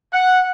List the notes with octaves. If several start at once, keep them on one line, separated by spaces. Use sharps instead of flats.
F#5